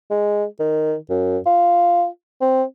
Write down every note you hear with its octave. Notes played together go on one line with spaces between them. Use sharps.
G#3
D#3
F#2
F4
C4